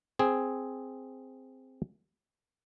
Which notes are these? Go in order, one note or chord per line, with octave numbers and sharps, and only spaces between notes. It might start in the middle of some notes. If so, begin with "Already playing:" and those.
C4 G#4